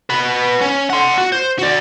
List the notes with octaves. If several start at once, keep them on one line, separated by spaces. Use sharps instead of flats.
F#4 B4
C#4
F#5 C6
F#4
C5
F#4 D5